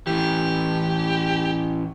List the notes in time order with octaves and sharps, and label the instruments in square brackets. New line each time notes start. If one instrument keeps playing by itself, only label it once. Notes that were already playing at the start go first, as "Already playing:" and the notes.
[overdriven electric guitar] A2 E3 [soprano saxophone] G4